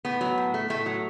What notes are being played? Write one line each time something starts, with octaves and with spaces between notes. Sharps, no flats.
A2 B3
F#3
A2
A3
A2 A3
F#3